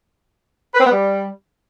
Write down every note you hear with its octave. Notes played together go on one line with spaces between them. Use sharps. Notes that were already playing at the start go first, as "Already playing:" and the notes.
B4
C4
B3
G3